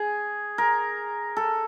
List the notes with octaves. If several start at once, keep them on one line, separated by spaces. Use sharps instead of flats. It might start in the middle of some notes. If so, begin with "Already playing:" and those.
Already playing: G#4
A#4
A4